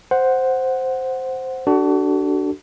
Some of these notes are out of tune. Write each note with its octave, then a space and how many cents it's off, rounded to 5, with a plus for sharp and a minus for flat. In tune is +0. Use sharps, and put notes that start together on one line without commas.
C5 +0 F#5 +0
D4 +0 F#4 +35 A4 +0